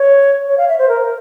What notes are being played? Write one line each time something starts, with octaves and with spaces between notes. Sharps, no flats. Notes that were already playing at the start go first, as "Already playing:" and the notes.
Already playing: C#5
C#5
F5
E5
C5
A#4